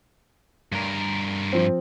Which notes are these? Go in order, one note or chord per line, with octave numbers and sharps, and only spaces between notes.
G2 A#4
F3 C4